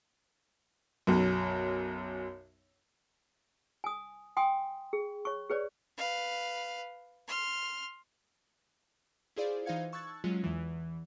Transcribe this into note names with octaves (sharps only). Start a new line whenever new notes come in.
B1 F#2
G#5 D#6
G5 G#5 C6 D#6
G#4
C#5 C#6
G#4 B4 C#5 D5
B4 F5
C6 F6
E4 F4 G#4 C5 D5 F5
E3 D#4 C5 F5 G#6 C#7
A5 C#6 E6 F#6 G#6 A6
F#3 G#3 C#4 F4
E2 E3